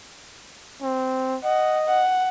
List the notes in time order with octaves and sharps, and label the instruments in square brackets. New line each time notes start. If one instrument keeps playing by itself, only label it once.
[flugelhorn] C4
[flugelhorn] D#5 [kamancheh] F#5
[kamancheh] F#5